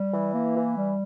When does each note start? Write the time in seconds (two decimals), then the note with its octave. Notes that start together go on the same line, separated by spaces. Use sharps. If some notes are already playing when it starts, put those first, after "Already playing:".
Already playing: G3
0.12 E3
0.34 A#3
0.55 E3
0.76 G3